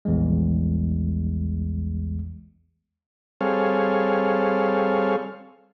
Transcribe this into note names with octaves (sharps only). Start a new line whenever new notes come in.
A#1 E2 E3 G3 G#3
G3 C4 G#4 A4 C#5 F5